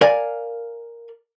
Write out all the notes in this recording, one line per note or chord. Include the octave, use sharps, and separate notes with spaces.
A#4 D5 F5 G#5